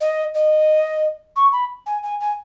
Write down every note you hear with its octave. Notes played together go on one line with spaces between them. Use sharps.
D#5
D#5
C#6
B5
G#5
G#5
G#5